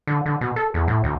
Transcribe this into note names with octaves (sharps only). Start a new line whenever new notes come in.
D3
D3
B2
A4
E2
A2
D2